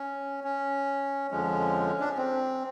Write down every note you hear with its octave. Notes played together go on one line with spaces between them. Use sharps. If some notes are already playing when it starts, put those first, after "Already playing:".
Already playing: C#4
C#4
F2 D3 F3 G#3 C#4
D4
C#4
C4